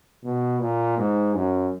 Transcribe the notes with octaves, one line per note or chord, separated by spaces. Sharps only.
B2
A#2
G#2
F#2